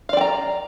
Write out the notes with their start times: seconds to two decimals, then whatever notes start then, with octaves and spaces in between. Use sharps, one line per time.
0.09 F5
0.13 D5
0.17 G5
0.21 A#5